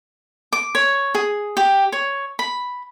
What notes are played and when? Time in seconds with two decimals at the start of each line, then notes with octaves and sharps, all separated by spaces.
0.53 D6
0.75 C#5
1.15 G#4
1.57 G4
1.92 C#5
2.39 B5